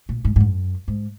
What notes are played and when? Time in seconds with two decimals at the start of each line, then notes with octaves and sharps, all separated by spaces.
0.09 A#2
0.25 G#2
0.36 G#2
0.40 F#2
0.88 G#2